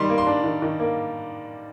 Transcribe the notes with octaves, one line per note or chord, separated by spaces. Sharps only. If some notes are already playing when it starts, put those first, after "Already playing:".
Already playing: D#3 G3 C6
A#3
C6
D4
D#3
D#3
A#3